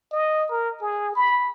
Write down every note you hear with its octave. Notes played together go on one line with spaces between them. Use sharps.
D#5
A#4
G#4
B5